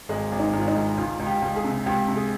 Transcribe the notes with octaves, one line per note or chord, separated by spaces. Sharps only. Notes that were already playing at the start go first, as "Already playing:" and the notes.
G#1 G#3
G#1
D#4
G#1
F4
D#4
G#2
C#2 F4
C#2
G4
C#2
G#4
C3
C#2 G4
C3
G#4